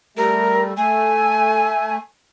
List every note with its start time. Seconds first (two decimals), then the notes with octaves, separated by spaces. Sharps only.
0.17 G3 A3 A#4
0.77 A3 G#5